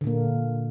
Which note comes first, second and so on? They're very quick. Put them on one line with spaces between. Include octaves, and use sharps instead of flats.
D3 A#2 A#3